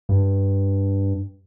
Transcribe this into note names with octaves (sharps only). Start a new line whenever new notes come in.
G2